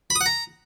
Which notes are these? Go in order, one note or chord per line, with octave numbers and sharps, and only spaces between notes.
B5
D#6
F#5
A#5